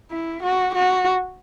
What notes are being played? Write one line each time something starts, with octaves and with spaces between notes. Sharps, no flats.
E4
F#4
F#4